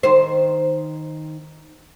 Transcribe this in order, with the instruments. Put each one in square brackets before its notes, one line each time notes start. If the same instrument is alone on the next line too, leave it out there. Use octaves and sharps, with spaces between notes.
[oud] D#3 C5